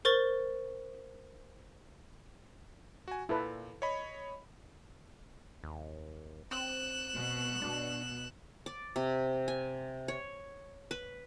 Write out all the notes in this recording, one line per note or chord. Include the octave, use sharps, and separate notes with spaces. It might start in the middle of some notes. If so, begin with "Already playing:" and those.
A#4 C5 C#6 A6 G7
F#4 G#5
A#2 E4 A4 B4
C#5 D#5 B5
D#2
C4 F#6 E7
B2
B2 D4
D5
C3
G#5
C#5
B4